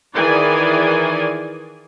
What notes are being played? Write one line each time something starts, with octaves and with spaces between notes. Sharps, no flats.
D#3 E3 G#4 D5 G#5